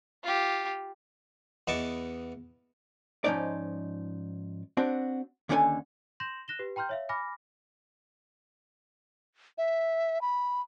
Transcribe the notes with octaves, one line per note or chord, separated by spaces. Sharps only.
F4 G4
E2 B3 D#5 A5 C#6 D6
G#2 F3 C#4 D#4 D5
C4 D4 F#4
D#2 D3 C#4 E4 A4 G#5
C6 G6 A#6 E7 F#7
F#6 A#6 E7 G7
G4 B4
G5 A#5 C6 F6 G6
C#5 E5 F5
G#5 B5 D6 F6 A#6
E5
B5